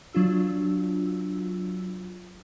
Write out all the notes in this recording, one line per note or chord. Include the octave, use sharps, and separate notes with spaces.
F#3 D4 F4 E6